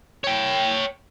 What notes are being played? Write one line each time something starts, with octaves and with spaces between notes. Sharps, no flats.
C#5 G5